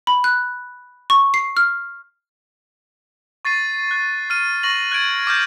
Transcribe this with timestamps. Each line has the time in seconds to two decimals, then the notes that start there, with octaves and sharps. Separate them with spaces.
0.07 B5
0.24 F#6
1.10 C#6
1.34 C7
1.57 F6
3.45 C#6 A6 C7 D#7
3.91 F#6
4.30 F6 D#7
4.63 C#6 A#6 F#7
4.91 F#6 G#6 A6 D7
5.27 D6 F6 G6 A6